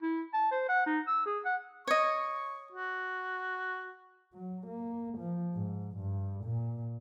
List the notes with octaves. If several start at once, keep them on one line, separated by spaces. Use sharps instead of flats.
E4
A5
C5
F#5
D#4
E6
G#4
F#5
C#5 D#5 C#6
F#4
F#3
A#3
F3
G#2
G2
A#2